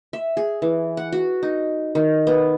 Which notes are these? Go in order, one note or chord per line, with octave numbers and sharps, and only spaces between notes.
E5
G#4
E3
F#5
F#4
D#4
D#3
B3